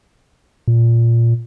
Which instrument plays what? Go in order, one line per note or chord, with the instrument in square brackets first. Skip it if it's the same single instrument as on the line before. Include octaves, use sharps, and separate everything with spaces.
[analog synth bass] A#2